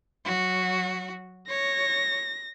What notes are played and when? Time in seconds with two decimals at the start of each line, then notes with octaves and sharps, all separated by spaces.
0.25 F#3 F#4
1.49 C#5 A#6